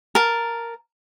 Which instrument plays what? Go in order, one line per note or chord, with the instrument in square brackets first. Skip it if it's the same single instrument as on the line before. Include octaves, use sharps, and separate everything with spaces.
[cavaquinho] A#4 A5